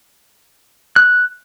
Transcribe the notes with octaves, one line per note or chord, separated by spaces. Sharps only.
F#6